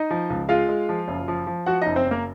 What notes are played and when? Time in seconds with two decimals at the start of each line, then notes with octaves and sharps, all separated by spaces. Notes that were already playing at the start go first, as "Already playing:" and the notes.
Already playing: D#4 D#5
0.10 F3
0.30 C#2
0.49 G#3 F4 F5
0.69 G#3
0.89 F3
1.08 F#1
1.28 F3
1.47 F3
1.66 F3 F#4 F#5
1.82 F#1 D#4 D#5
1.96 C4 C5
2.06 F#1
2.11 A#3 A#4